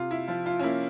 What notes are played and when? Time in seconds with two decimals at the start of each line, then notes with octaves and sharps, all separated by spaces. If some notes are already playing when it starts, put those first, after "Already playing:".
Already playing: C3 F4
0.11 E4
0.28 F3 F4
0.46 F4
0.59 C#4
0.63 A#3 E4